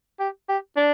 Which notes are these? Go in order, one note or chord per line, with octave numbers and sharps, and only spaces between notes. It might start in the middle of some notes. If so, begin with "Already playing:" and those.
G4
G4
D4